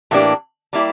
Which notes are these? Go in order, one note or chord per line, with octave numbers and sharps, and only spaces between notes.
A2 E3 A#3 D4 G4
G3 A#3 E4 G4